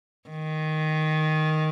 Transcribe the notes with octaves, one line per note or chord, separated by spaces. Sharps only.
D#3